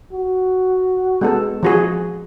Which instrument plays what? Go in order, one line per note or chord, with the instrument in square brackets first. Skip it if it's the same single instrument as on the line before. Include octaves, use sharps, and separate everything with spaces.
[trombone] F#4
[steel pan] G#3 B3 A4
F3 F#4 G#4